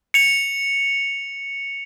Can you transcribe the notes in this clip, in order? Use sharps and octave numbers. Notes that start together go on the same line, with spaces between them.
C#7 F7